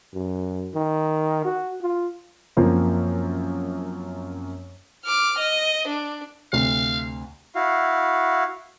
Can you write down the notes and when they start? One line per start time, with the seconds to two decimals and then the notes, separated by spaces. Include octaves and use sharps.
0.14 F#2
0.75 D#3
1.45 F#4
1.82 F4
2.57 F#2 F3 A#3 C4
5.05 D6 F6
5.38 D#5
5.88 D4
6.53 D2 C3 F5
7.55 E4 F#4 F5